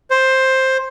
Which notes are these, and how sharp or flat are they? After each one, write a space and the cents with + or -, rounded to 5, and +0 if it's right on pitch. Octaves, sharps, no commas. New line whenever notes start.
C5 +10